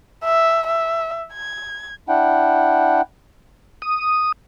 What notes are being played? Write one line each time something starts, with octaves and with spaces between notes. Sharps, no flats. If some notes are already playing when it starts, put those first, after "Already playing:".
E5
E5
G#6
D4 E4 F#5 G5
D#6